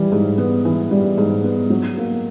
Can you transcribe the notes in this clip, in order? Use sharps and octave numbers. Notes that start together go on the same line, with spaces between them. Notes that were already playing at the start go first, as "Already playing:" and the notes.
Already playing: E3 G3
G#2
B3
E3
G3
G#2
B3
F#3
A#3